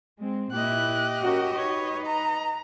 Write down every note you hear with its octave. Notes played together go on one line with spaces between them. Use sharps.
G#3 C4
A#2 E4 G4 D#5 F#6
C#4 F#4 A#4
D#4 B4 C#5
D#5 A#5